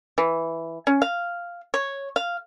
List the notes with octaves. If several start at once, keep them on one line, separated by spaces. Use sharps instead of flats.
E3
C#4
F5
C#5
F5